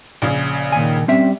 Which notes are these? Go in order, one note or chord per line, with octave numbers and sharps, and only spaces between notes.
A#1 C#3
A#2 D#3 G#5
G3 C4 C#4 E5